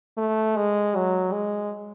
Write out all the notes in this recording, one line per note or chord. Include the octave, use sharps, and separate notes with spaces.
A3
G#3
F#3
G#3